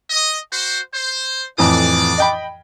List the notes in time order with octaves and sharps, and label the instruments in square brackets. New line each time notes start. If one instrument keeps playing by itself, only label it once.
[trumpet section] D#5
F#4 C5
C5
[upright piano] F2 A2 E3 [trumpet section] D4 D5 D6
[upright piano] D#5 G5 B5